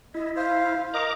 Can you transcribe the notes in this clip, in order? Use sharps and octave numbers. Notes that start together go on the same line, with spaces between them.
E4 D#5
C5 F5
A#4 D#5 A#5 D6